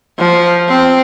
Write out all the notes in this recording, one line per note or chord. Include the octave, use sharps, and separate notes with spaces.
F3
C4